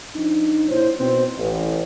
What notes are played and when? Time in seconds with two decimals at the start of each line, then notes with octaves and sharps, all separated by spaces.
0.16 F3 D4 D#4
0.68 A#2 E4 C5 C#5
0.99 B2 C4
1.37 A1